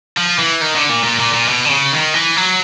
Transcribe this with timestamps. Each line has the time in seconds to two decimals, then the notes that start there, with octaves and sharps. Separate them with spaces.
0.17 F3
0.38 E3
0.61 D#3
0.75 D3
0.89 A#2
1.04 A#2
1.20 A#2
1.34 A#2
1.49 B2
1.65 D3
1.70 C#3
1.93 D#3
2.14 E3
2.37 F#3